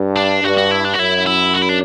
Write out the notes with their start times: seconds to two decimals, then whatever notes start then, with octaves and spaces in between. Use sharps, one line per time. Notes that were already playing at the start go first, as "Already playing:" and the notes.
Already playing: G2
0.16 D4
0.43 G2 F#4
0.57 F#4
0.71 E4
0.84 D4
0.94 F#4
0.98 F#2 E4
1.26 E4
1.54 F#4
1.62 E4
1.69 D4